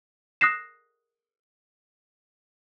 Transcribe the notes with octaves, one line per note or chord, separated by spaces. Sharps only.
D#6 F#6 A#6 C7 E7